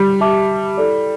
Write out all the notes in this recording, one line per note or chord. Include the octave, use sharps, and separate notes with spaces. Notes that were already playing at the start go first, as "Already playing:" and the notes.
Already playing: G3
G4 E5 A5 D6
E4 A4 D5